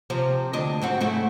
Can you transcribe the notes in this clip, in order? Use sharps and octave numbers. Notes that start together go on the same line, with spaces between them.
C3 F3
D2 D4 D#5
G#2 C4 F#4
G#2 A3 E4